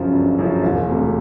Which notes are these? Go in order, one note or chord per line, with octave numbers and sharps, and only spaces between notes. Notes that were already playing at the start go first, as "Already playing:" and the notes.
Already playing: G1 F#2 C#3 F3
G1
F#2 C#3 F3
E1
D2 C3